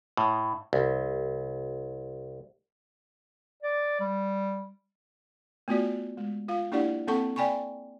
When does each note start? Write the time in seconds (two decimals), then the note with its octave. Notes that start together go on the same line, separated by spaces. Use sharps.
0.17 A2
0.73 C2
3.62 D5
4.00 G3
5.68 A3 B3 F4 F#4 D5
6.17 G#3
6.48 F4 F5
6.72 A#3 D4 E4 G4 D5 F#5
7.07 A#3 C4 A4 F#5 A5 C#6
7.36 D5 G5 G#5 B5 C#6